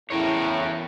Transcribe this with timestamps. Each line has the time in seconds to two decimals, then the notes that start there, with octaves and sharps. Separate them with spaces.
0.10 E2 A2 C#3 E4 A#4 C#5